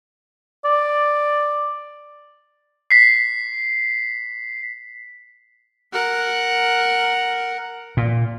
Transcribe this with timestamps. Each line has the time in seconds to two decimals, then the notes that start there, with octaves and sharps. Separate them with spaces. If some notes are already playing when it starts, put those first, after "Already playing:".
0.65 D5
2.91 B6 C7
5.92 A#4 F#5
7.97 A#2